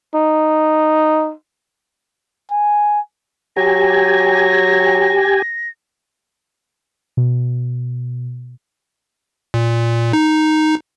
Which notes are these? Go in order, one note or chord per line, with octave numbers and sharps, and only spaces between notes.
D#4
G#5
F#3 G4 G#5 A#6
B2
A#2
D#4